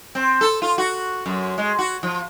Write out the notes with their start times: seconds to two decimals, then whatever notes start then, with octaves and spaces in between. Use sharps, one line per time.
0.15 C4
0.41 A4
0.62 F4
0.78 F#4
1.26 F#2
1.58 G#3
1.79 F#4
2.03 F3